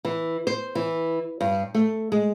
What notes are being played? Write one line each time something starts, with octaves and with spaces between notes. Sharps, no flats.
E3
C5
E3
G2
A3
G#3